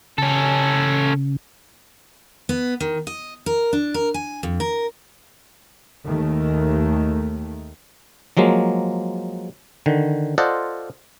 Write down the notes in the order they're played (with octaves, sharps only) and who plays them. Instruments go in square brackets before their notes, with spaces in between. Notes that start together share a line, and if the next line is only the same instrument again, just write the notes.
[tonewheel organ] C#3 [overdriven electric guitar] C#4 A4
[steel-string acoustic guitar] B3
D#3
D#5
A#4
D4
A#4
G#5
F2
A#4
[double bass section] D#2 D#3 A3
[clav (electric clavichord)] F3 F#3 G#3 A#3
D3 D#3
F4 A4 C5 D5 D#5 F#5